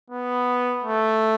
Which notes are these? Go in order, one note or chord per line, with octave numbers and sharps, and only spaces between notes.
B3
A3